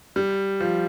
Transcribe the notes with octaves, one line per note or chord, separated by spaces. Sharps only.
G3
F3